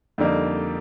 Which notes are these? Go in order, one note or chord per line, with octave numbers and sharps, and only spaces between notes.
F2 D3 G3 A#3 D#4